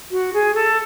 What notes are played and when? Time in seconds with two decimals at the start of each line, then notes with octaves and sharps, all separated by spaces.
0.11 F#4
0.33 G#4
0.55 A4